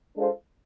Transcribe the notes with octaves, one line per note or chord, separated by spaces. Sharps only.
G#3 D4 F4 A4 C5